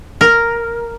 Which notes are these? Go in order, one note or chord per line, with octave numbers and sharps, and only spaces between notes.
A#4